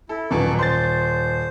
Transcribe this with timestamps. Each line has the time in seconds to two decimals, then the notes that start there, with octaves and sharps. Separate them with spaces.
0.09 E4 A4
0.31 D#1 F#2 B2 E3 A5 C#6 D6
0.59 C5 C6 A6